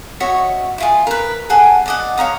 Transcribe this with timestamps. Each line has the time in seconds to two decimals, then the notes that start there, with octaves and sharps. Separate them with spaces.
0.20 F#4 C#5 D#5 E5
0.78 E4 F4 G#4
1.07 A#4 B4
1.50 G#4 A4 F#5 G#5
1.86 D5 D#5 F#5
2.18 C#5 F5 A#5 D#6